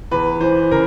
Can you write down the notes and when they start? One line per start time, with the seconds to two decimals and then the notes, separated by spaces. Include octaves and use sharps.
0.11 E2 B4
0.41 E3 C5
0.71 C#3 A#4